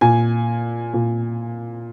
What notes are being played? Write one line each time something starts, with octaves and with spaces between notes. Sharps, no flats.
A#2 G#5
A#2